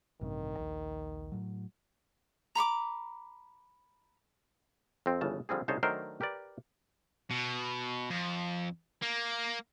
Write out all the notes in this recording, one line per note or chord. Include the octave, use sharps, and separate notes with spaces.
A1 G2 C3 D#3
A#1 D#2
A2 F#3
A#5 B5 C#6 D6
F2 C4
G1 C#3 E3 A5
D3 F3 G3 C4 G#4
C2 C#3 D#4 C5 C#5 A5
D#3 F#3 A3 D4 A#4 C5
G4 A#4 B4 D5
B2
F2
A#3